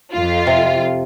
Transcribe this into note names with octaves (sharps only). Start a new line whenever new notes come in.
F2 F4
C3